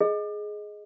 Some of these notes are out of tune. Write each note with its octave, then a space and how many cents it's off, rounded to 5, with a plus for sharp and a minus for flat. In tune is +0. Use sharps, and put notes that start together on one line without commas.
G#4 +10 D#5 +0